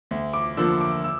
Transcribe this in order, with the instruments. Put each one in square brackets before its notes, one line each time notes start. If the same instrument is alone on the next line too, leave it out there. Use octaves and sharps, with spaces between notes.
[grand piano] D2
D6
D3 F3 A#3 E6
D6
E6